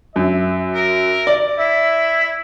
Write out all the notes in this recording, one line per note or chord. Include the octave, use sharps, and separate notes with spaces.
F#2 E5
A#4
D5
E4 E5